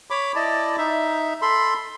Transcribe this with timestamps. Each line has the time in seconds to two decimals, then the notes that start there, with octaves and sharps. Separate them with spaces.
0.10 C#5 B5 D6
0.36 E4 D5 D#5 A5
0.78 D#4 E5
1.42 A4 B5 C6